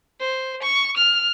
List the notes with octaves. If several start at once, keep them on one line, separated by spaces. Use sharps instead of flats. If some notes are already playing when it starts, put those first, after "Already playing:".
C5
C#6
F6